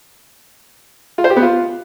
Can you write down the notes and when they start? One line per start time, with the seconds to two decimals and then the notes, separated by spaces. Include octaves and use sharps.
1.18 F4
1.24 C5
1.30 G4
1.36 B3
1.42 F4